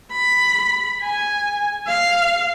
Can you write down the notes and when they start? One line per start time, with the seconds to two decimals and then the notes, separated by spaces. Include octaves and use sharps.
0.12 B5
1.03 G#5
1.87 F5